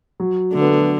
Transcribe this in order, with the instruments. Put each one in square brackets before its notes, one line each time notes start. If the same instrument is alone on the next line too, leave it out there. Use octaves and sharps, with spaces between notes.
[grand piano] F#3
[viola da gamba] D3 [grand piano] A3
[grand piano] B3
A3
F#3